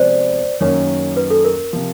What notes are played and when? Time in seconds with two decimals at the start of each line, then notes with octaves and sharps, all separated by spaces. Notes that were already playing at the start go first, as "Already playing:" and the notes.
Already playing: C3 F3 G#3 B3 C5 D5
0.60 F#2 D#3 F#3 A#3 C#4 C#5
1.17 B4
1.30 A4
1.45 A#4
1.73 C3 F3